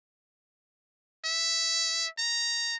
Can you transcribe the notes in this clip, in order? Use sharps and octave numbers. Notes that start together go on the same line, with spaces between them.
E5
A#5